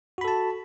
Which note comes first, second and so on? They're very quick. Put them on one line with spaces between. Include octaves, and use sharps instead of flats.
F#4 B5 A4 A5